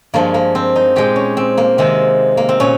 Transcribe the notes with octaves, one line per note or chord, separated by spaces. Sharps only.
G2 F3 G#3 A#3
A#3
C4
D#4
A#2 G#3 G4
C#4
C4
A#3
C3 D#3 G#3 C4
A#3
C4
A#2 C#4